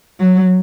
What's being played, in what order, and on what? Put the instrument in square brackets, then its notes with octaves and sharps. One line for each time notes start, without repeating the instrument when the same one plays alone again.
[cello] F#3